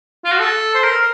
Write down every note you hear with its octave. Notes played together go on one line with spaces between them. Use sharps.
F4
F#4
A4
C5
A#4